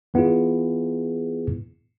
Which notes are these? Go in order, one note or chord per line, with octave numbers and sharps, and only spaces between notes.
E3 B3 E4 F4 G#4